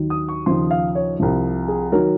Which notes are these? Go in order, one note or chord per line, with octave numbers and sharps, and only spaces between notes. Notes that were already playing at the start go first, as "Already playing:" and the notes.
Already playing: D#2 D#3 F#3
D#6
C#6
D#2 C#3 F3 C6
F5
C#5
C2 C3 F3
G#4
D#3 F#3 A#4